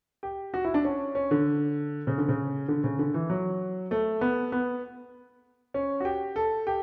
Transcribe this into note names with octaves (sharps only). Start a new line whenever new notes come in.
G4
F#4
E4
D4
C#4
C#4
D3
C#3
D3
C#3
D3
C#3
D3
E3
F#3
A3
B3
B3
C#4
F#4
G4
A4
G4